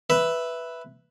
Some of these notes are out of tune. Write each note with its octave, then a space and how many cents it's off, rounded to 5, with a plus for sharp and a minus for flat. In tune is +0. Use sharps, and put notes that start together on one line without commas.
B4 +0 E5 +0